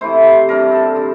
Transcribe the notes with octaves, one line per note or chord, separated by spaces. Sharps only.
C3 E3 A3 E4 C5
C3 G3 D4 A#4
A4
D3 F3